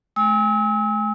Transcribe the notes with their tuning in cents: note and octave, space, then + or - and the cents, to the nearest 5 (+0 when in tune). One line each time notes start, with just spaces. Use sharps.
A3 -40 G#5 -30 E6 -40